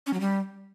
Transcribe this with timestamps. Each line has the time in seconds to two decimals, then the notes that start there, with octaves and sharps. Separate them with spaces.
0.07 C#4
0.13 F#3
0.20 G3